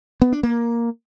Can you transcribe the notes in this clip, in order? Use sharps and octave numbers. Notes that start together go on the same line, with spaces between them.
B3
D4
A#3